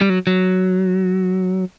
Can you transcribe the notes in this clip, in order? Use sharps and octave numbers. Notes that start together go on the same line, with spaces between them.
G3
F#3
F#3